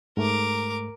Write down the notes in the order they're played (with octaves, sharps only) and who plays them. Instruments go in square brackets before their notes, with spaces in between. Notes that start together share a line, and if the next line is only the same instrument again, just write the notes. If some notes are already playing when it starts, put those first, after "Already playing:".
[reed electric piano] G#2 A3 [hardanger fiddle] A#4 D6